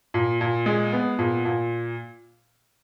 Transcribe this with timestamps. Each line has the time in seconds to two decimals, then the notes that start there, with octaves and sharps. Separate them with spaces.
0.14 A#2
0.41 A#2
0.66 G#3
0.93 B3
1.19 A#2
1.45 A#2